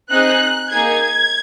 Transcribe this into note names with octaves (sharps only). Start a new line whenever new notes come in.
C4 D#4 G#4 F#6
A#3 D#4 G#4 G#6